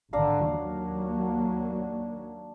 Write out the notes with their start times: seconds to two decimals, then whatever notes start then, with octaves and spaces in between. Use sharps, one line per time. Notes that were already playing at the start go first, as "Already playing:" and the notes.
0.13 G#1 D3 D4 F5 A#5
0.49 D#2 F#3 A#3